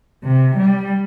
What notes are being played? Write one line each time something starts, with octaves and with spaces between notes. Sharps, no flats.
C3
G3